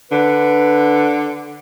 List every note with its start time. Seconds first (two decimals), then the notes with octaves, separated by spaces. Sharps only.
0.12 D3 B4